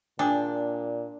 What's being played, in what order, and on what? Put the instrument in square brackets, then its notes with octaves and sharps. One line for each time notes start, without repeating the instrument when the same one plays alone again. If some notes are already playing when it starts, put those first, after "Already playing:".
[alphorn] A#2 [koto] D4 [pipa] G#4 G5